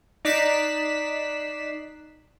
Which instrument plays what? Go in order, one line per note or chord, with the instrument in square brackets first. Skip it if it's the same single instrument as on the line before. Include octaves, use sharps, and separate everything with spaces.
[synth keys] D#4 D5 F#6 B6 C7 E7